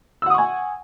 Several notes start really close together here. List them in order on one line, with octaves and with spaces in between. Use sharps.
E6 F#5 D#6 C#6 G#5